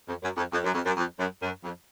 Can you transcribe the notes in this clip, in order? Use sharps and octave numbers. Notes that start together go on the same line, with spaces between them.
F2
F#2
F2
F2
F#2
F2
F#2
F2
F#2
F#2
F2